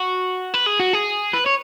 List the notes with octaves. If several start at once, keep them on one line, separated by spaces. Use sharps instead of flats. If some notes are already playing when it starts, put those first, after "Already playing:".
Already playing: F#4
B4
G#4
F#4
G#4
B4
C#5